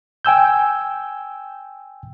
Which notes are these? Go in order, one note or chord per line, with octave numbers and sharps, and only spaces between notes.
G5 G#5 E6 G6